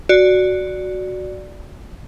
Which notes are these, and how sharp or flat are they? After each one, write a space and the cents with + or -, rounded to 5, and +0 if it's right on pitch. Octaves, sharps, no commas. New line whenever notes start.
F#4 +0 D5 +0